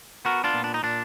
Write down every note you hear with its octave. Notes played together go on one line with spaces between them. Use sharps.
B3 F#4 A#4
D4 F4
A#2
D4
D#4
A#2 D4